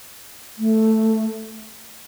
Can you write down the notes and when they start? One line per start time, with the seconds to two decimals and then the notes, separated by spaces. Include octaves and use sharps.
0.58 A3